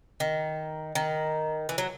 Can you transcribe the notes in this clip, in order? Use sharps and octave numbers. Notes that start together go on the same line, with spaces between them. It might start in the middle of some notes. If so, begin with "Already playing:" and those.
D#3
D#3
E3
F#3